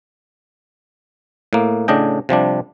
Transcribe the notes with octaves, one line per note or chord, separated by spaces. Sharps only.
A2 A#3
A2 C#3 D4 D#5 G5
C3 F3 G3 D4